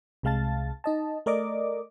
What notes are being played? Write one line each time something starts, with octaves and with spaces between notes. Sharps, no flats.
C2 C3 G#3 F5 A5 A6
D#4 D#5 A5
A3 A#4 D5 D#5 D6